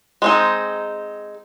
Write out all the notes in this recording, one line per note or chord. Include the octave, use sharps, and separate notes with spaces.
G#3 C4 D#4